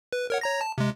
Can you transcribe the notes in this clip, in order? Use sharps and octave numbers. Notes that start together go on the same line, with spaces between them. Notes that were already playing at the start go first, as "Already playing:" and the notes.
B4
A#4 C#5 F#5
C#5 A#5 A#6
A5
C3 G#3